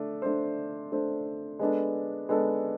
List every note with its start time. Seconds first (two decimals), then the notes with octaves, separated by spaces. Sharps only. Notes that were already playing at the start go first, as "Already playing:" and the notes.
Already playing: A3 D4
0.22 A3 D4 A4 C5
0.92 A3 D4 A4 C5
1.59 G#3 B3 D4 A4
2.29 G#3 B3 D4 A4